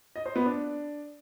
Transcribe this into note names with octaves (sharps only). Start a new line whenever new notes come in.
D#5
C5
B3
D4